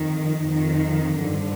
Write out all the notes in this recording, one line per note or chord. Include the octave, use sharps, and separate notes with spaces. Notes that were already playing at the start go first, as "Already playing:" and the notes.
Already playing: F2 D#3
F2 D#3
G2 D3 F3